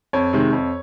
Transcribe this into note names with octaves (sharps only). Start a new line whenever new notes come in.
F2 C#5
C3 D#3 G#3
F2